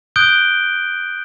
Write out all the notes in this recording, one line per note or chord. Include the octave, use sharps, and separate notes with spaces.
D#6 F#6 G6 D7 G7